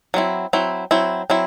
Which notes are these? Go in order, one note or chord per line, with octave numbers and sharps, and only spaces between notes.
F#3 C4 E4
F#3 C4 E4
F#3 C4 E4
F#3 C4 E4